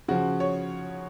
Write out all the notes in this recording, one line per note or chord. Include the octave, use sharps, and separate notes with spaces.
C#3 F3 F#4
C#5